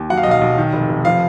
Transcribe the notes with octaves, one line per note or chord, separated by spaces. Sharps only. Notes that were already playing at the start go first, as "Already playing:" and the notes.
Already playing: D#2
F#3 F#5
F5
B1 D#5
F5
B1
D#3
F1
F1
F3 F5